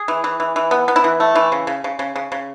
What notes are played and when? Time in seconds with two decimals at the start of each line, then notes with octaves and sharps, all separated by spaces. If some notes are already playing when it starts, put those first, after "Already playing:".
Already playing: G#4
0.08 E3
0.24 E3
0.40 E3
0.56 E3
0.71 B3
0.88 B3
0.96 E4
1.04 E3
1.20 A3
1.35 E3
1.52 C#3
1.67 C#3
1.84 C#3
1.99 C#3
2.16 C#3
2.32 C#3